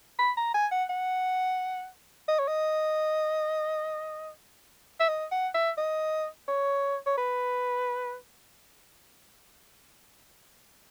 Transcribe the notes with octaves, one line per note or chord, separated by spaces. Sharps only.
B5
A#5
G#5
F#5
F#5
D#5
C#5
D#5
E5
D#5
F#5
E5
D#5
C#5
C#5
B4